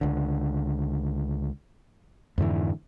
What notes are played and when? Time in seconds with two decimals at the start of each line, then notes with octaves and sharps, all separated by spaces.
0.01 C#2 D3
2.38 F2 G#2 D3 E3